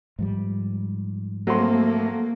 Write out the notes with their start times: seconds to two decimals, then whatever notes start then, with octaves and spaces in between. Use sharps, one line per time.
0.19 G#2 F3 G3
1.47 F#3 A3 A#3 C4 C6